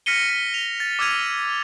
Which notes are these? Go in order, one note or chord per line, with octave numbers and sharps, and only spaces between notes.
F6 A#6 B6 C#7 D#7 G7
B6 C#7
F7
A6
D6 E6 F6 G#6 D#7 F7